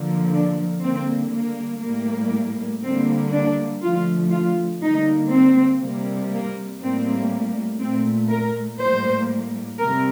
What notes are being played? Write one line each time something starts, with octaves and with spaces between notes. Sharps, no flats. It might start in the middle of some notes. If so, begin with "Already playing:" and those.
Already playing: D3 F3 A#3
D4
D3 G3 A#3 C4
A#3
A2 G3 A#3
D3 G3 A#3 C4
D4
D3 F3 A3 F4
F4
D3 G3 A#3 D#4
C4
C3 G3 A#3
A#3
A2 G3 A#3 C4
A#2 A3 C4
A#4
A2 G3 A#3 C5
C3 G3 A#4